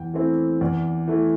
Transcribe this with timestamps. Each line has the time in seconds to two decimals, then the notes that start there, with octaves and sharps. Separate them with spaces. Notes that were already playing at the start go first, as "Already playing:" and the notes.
Already playing: E2 G5
0.14 E3 A3 C4 E4
0.61 E2 D5
1.08 E3 A3